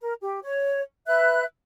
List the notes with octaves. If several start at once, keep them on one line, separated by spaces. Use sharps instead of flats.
A#4
G4
C#5
B4 E5 F#6